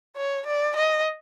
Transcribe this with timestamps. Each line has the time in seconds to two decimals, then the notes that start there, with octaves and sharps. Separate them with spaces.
0.16 C#5
0.47 D5
0.76 D#5